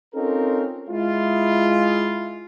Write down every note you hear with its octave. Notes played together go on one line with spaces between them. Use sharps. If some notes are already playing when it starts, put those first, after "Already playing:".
C4 C#4 D#4 F4 A4 A#4
G#3 E4 F4